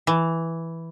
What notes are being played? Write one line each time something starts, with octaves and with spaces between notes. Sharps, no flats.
E3